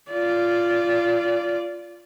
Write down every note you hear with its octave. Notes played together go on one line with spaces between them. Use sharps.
F4 D5